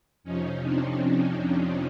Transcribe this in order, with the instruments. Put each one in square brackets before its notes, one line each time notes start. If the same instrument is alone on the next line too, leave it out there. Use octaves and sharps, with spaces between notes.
[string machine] F2 C3 F3 C#4 D#4
C4 D4